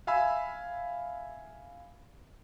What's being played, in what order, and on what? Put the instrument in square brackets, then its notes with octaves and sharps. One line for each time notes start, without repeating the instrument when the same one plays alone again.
[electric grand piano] E5 F5 G#5 B5 E6